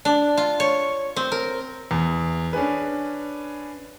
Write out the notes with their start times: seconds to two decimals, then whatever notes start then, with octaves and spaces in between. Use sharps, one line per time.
0.05 D4
0.37 F4
0.60 C#5
1.16 C4
1.32 A#4
1.91 E2
2.53 C#4 D4 G#4 B4